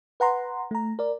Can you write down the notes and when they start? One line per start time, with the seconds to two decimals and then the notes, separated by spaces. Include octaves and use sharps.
0.20 B4 F#5 A#5 C6
0.71 A3 A#5
0.99 A#4 D5